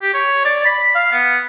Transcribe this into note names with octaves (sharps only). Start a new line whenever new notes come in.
G4
C#5
D5
B5
F5
B3